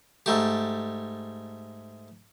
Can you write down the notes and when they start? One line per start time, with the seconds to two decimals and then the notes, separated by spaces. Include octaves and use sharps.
0.26 G#2 A3 G4